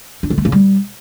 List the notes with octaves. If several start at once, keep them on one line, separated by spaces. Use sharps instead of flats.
D4
D3
A3
C#3
G3